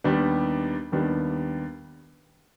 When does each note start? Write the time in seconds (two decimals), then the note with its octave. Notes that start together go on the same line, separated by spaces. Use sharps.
0.04 D#2 D#3 G3 B3 D4
0.92 D#2 D#3 G3 B3 D4